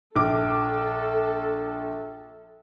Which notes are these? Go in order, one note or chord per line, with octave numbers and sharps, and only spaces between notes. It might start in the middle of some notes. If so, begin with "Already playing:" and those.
A#1 A4 D6